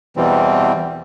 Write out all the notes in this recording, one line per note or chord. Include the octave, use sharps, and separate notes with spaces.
E2 B2 E3 G3 C4